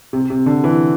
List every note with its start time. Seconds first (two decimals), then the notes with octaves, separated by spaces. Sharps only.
0.13 C3
0.30 C3
0.46 D3
0.64 E3